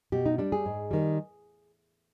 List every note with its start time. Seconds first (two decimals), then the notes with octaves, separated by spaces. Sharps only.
0.12 B2 G4
0.26 D#4
0.38 G3 D4
0.52 G#4
0.66 G#2
0.91 D#3 G3